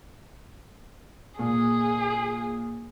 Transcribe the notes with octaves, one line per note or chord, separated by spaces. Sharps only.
A#2 G#4